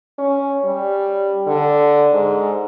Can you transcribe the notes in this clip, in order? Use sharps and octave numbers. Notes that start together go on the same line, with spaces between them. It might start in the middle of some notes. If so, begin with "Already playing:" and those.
C#4
G3
D3
G#2